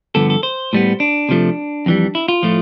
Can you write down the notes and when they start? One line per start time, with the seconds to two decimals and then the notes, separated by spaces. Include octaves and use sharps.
0.15 G2 D3 F3 B3 A4
0.30 A4
0.43 C5
0.73 A2 G3 B3
1.00 D4
1.29 C3 F3 A3
1.86 F2 E3 G3
2.15 E4
2.28 F4
2.43 A2 F3 A3